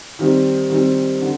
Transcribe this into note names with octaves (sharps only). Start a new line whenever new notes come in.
D#3 G3 C4
D#3 G3 C4
D3